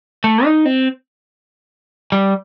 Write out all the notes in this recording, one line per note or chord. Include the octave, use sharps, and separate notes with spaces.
A3
D#4
C4
G3